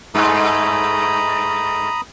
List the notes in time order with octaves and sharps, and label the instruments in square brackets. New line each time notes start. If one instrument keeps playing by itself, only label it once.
[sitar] G2 G#3 A3 [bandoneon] A#5 B5 D#6